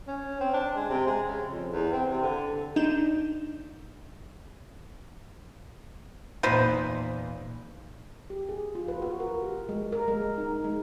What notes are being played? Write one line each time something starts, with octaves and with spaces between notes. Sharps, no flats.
C#4
C4
D4
G#3
C3
G#3
C#3
F2
E2
C4
C3
D3
D4 D#4 G6 E7
E2 A#2 D#4 B4 C5
G4
G#4
F4
B4
F#4
A#4
G4
G#3
A#4
G#3
D#4
G#3